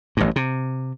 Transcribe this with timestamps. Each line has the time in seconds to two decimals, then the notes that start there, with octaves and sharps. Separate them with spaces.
0.17 A1 G2
0.36 C3